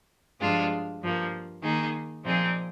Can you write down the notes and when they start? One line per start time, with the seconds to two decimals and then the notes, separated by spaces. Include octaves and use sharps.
0.40 G2 F3 G#3 D4 F4
1.01 G2 F3 A#3
1.62 D#3 A#3 D#4 G#4
2.24 A#2 F3 C4 D#4 G#4